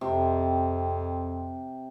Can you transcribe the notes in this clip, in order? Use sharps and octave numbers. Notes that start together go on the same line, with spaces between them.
F2 C3